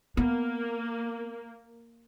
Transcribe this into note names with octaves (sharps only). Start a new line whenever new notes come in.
A#3 B3